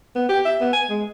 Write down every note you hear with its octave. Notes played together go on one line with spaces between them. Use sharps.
B3
G4
E5
B3
G#5
G#3